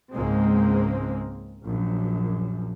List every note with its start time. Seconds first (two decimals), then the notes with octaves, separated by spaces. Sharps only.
0.13 C#2 G#2 G#3 A#3 C4
1.65 A#1 F#2